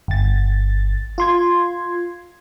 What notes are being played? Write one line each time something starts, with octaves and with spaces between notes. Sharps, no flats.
G1 A6
F4 C6 G#6